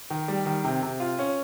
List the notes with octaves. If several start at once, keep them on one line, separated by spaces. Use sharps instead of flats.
D#3
G3
D#3
C3
C3
F4
C#4